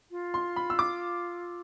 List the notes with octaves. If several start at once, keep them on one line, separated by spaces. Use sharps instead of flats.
F4
C6
B5
E6
D6